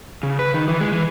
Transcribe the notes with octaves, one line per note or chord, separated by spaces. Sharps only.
C#3
B4
D#3
E3
G#3
E3